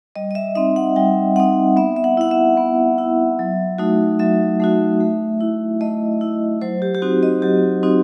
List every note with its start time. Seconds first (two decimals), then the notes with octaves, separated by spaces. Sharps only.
0.16 G3 D#5
0.31 D#5
0.35 E5
0.55 C4 D#4 E5
0.76 F#5
0.96 G3 G5
1.36 C4 D#4 F#5
1.77 B3 E5
1.96 E5
2.04 F#5
2.17 E4 F#5
2.31 E5
2.57 B3
2.98 E4
3.39 F#3
3.78 A3 D#4 F#4
4.19 F#3 E5
4.60 A3 D#4 F#4
5.00 A3
5.41 E4
5.81 A3 D#5
6.21 E4
6.62 F#3 C5
6.82 G4
6.95 G4
7.02 C4 D#4 F#4
7.23 D#5
7.42 F#3 G4
7.83 C4 D#4 F#4